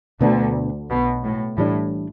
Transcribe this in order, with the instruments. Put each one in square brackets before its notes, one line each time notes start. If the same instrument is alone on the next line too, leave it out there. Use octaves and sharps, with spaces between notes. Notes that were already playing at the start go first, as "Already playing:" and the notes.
[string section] D2 D3 [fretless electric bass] B2 B3 D4
[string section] B1 B2
A2
[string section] A2 [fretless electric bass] E3 G3 D4